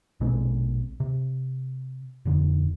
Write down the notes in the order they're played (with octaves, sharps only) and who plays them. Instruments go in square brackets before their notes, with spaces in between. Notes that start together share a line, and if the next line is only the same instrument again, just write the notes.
[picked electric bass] A#1 B2 G#3 C4
C3
D#1 F2 D3